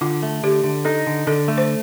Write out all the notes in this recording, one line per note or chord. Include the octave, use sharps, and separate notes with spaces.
D3 F4
A3
D3 G4
D3
D#4 A4
D3
D3 A4
A3
C5